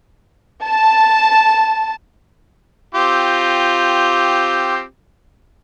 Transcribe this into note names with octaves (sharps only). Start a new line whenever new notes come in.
A5
C4 F4 G4